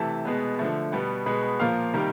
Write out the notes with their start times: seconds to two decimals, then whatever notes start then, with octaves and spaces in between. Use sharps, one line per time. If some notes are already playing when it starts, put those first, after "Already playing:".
Already playing: C3 E3 A3 A5
0.25 B2 G#3 B3
0.59 D3 F3 A3
0.92 B2 G3 B3
1.26 B2 G#3 B3 B5
1.43 B5
1.59 A#2 F3 A#3 F5
1.93 C3 D#3 G3 A#3